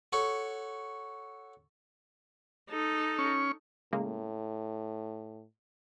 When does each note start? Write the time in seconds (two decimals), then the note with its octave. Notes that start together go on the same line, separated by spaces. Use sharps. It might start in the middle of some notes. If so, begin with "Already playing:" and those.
0.13 F#4 A4 C#5
2.70 D#4 A4
3.19 C#4 C#6
3.93 A2 C#3 G#3 A#3